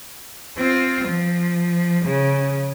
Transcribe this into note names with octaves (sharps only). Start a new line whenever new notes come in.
C4 F4
F3
C#3